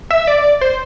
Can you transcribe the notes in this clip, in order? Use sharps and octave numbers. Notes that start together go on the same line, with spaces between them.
E5
D5
C5